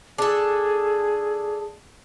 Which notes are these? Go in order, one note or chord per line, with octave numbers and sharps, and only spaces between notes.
D4 G#4 A4